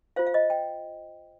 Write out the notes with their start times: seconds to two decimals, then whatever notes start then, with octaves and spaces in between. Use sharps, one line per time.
0.16 F4 C5 F5
0.26 F5
0.34 D#5
0.50 G5